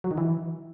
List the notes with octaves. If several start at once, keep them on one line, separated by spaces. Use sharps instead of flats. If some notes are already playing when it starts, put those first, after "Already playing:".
F#3
D#3
E3